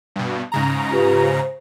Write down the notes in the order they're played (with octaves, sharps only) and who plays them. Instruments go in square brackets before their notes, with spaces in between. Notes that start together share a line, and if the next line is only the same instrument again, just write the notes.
[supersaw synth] G2 B2
G#2 C#3 A#5
[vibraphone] F4 G4 B4
C5